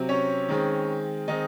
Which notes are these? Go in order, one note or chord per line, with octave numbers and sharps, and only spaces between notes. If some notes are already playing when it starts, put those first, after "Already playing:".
Already playing: C3 F#3 C4
C#4 C#5
D#3 G#3 C4
D#3 G#3 C4 D#4 D#5